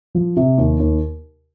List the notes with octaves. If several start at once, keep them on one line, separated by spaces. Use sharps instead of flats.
F3
C3
D#2
D#2